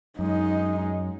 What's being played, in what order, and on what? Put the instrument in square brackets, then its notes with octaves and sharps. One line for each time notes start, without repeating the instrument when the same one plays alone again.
[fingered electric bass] F#2 [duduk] G#3 [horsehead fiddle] D#4